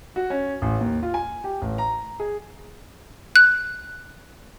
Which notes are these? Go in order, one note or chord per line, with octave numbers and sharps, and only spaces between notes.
F#4
C#4
A1
D#2
F4
G#5
G4
A1
A#5
G#4
F#6